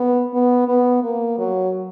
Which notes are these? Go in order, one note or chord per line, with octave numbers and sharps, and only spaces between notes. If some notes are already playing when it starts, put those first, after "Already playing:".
Already playing: B3
B3
B3
A#3
F#3